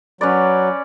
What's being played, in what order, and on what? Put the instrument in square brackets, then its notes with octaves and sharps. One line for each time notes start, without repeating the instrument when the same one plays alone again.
[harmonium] F#3 [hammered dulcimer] C#4 B4 D5